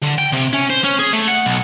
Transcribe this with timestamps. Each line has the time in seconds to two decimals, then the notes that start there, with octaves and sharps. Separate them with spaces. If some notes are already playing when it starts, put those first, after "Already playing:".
0.02 D3
0.18 G5
0.33 C3
0.53 C#4
0.70 C5
0.84 C#4
0.99 G#4
1.13 A3
1.28 F#5
1.46 B1